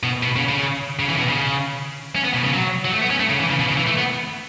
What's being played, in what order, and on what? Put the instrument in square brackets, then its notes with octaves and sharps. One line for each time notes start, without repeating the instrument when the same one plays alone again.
[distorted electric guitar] B2
B2
C#3
C#3
C#3
E3
C#3
B2
C#3
C#4
B3
B2
C#3
F#3
F#3
A3
B3
C#4
A3
C#3
E3
C#3
B2
C#3
E3
A3
B3